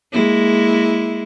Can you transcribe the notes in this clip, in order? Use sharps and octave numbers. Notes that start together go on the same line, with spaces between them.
G#3 A#3 E4